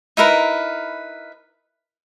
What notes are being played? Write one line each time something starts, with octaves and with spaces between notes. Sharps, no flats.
D#4 E4 A#4 B4